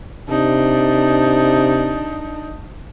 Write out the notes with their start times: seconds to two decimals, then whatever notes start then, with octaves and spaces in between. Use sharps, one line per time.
0.30 C3 D4 D#4